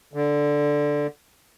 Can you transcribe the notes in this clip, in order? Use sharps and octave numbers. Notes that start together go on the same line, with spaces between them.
D3